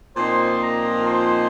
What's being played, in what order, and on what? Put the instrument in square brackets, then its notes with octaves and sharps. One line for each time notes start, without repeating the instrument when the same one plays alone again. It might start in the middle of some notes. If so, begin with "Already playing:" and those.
[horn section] A#2 F3 C4 D#4 C5 C6
A#4 A#5
C5 C6